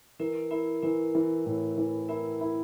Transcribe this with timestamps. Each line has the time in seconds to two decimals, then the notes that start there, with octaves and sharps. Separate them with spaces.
0.19 E3 A#4
0.51 E4 A#4
0.82 E3 A#4
1.15 E3
1.46 A2
1.77 E3
2.09 E4 A#4
2.41 E4